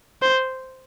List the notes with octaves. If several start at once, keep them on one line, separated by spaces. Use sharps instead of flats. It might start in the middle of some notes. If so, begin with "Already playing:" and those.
C5